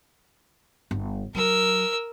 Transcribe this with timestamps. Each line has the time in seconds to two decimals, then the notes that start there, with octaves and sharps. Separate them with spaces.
0.91 G1
1.35 F#3 A#4 E6